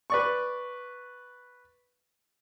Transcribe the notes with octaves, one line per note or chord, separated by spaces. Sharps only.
B4 D5 C#6